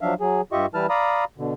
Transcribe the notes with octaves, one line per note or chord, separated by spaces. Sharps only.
F3 F#3 D4 E5 F5
F#3 G#4
G2 F4 G4 D#5 E5 C#6
E3 G3 E4 B4 A5 F6
D5 F5 A#5 B5 D#6
B2 D3